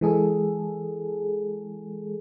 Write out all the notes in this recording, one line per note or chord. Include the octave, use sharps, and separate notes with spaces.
E3 G#3 G#4 A4